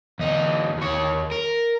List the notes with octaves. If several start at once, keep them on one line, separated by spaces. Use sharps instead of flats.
E2 D#4
D#2 C#5
A#4